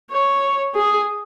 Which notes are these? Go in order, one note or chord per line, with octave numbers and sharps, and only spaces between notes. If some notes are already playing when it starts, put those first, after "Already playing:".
C#5
G#4